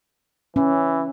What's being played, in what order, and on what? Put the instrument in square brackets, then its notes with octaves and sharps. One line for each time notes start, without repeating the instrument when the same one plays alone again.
[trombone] E3 [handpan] C#4